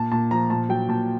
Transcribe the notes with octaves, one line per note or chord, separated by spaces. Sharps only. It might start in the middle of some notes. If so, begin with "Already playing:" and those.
Already playing: A#2 A5
A#2 A5
F3 A#5
A#2 A5
F#3 G5
A#2 A5